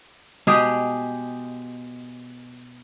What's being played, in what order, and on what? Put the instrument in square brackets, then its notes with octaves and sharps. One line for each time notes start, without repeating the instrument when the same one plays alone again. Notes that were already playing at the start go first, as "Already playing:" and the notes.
[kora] B2 G#3 G4 G#4